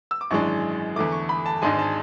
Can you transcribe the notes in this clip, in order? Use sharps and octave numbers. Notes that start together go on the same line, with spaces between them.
E6
D6
G#1 F#2 E3 G#3 D4 C#6
E2 D3 A3 D6
C#6
B5
A5
G#1 G#2 G#3 D4 G#5
A5